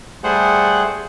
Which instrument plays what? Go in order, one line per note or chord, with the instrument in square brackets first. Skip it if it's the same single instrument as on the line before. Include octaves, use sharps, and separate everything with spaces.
[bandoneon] G3 A3 G#4 C5 F#5